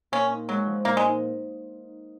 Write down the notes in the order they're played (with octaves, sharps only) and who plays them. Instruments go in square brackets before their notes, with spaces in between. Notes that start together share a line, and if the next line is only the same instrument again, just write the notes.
[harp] A#2 [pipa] C#4
[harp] D#4
[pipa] F#3 [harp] G#3
[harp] F3
[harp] A#2 [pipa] A#3
[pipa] G#3
[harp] D#4